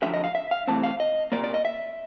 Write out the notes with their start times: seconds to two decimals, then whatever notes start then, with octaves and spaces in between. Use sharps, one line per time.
0.02 F#2 D3 F3 E5
0.14 D#5
0.24 F5
0.35 E5
0.51 F5
0.67 C2 C3 E3 A3 C4 A5
0.83 F5
1.00 D#5
1.32 C2 A#2 F3 A#3 D5
1.44 D5
1.54 D#5
1.65 E5